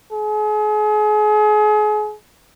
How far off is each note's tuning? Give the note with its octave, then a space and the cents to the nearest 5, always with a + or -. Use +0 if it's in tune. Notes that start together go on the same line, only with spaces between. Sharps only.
G#4 +35